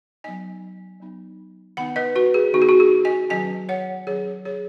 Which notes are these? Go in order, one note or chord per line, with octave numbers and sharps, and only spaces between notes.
F#3 B3 D#4 D#5 G#5
F#3 B3 D#4
D#3 B3 D#4 F#5 B5
B4 D#5
F#4 B4
G#4
D#3 B3 D#4 F#4
G#4
F#4
G#4
D#5 G#5
D#3 F#3 C#4 D#5 G#5
C#5 F#5
D#3 F#3 C#4 G#4 C#5
G#4 C#5